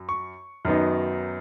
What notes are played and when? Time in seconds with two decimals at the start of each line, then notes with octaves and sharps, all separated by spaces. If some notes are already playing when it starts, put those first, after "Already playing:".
Already playing: F#2
0.09 C#6
0.65 F#2 D#3 F#3 B3 D#4